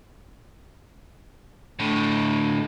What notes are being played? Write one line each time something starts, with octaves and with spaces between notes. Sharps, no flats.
A2 D3